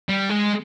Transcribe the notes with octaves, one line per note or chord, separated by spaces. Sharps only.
G3
G#3